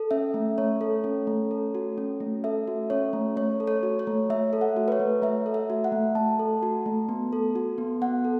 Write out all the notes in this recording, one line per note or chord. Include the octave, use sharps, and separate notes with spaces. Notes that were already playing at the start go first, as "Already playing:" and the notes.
Already playing: A4
C#4 E5
A3
A3 C#5
A4
C#4
A3
A4
F#4
C#4
A3
A4 E5
F#4
C#4 C#5
A3
A3 C#5
A4
C#5
F#4
C#5
A3
A3 E5
A4
F#5
F#4
B4
C#5
A3
A3 E5
A4
E5
F#4
F#5
A3
A3 A5
A4
F#4
A3
B3
A4
F#4
B3
B3 F#5
A4